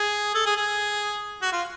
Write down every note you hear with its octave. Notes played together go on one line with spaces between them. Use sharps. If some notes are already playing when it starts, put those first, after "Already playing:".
Already playing: G#4
A4
G#4
G#4
F#4
F4